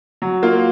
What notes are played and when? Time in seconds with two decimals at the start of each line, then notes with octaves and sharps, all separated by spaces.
0.22 F#3
0.43 A#3 F4